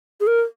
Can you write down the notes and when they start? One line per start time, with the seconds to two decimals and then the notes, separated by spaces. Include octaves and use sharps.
0.20 G#4
0.27 A#4